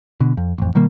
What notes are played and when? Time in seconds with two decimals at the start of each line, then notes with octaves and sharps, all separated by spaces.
0.20 B2 D3
0.37 F2
0.58 A1 F2
0.75 B2 D#3 G3 A#3